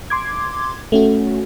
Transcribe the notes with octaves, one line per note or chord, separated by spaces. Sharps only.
C6 D6 G#6
A3 C#4 F#4